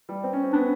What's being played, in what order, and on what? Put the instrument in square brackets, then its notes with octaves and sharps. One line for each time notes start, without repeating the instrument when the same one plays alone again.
[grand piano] G3
C4
C#4
C4
[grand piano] B3 [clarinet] D4